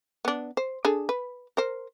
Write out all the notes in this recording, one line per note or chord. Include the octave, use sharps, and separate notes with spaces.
B3 D4
C5
D4 G#4 A4
B4
A#4 C5